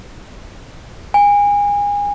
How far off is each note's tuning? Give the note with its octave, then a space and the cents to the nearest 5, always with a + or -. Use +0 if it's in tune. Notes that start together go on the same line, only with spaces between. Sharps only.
G#5 -30